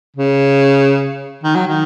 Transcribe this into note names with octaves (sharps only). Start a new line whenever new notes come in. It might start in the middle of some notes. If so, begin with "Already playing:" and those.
C#3
D#3
F#3
D#3